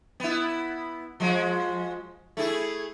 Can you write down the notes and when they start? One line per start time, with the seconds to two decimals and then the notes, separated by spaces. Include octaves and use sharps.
0.20 B3 E4
1.20 F3 G#3 F#4
2.37 A3 E4 G#4